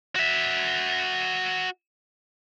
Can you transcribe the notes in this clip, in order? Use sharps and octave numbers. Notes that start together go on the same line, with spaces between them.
F#4 E5